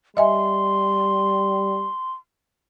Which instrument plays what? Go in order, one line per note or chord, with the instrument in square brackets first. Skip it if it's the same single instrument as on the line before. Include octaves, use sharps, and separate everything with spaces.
[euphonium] G3 [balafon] D#5 E5 G#5 [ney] C6